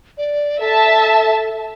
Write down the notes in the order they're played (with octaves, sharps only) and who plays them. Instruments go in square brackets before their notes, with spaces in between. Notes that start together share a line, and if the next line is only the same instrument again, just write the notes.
[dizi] D5
[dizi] A4 [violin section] E5 A5